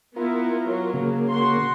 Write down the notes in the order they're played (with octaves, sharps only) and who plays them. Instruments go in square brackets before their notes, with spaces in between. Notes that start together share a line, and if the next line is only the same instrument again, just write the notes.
[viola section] B3 E4 [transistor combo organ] F4 A#4
[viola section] F#3
[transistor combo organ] C#3 A#3
[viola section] F#4 C6